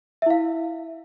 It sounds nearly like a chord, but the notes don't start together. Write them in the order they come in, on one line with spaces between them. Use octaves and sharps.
E5 E4 F5